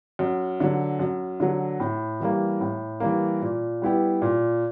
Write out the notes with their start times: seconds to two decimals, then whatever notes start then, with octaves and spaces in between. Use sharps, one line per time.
0.19 F#2
0.60 D3 F#3
0.99 F#2
1.40 D3 F#3
1.80 A2
2.20 E3 G3 A#3
2.61 A2
3.00 E3 G3 A#3
3.42 A#2
3.82 G3 B3 E4 G4
4.22 A#2